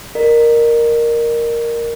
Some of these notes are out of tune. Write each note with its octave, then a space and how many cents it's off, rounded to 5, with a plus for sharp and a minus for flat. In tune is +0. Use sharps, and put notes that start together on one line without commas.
A#4 +0 D#5 -40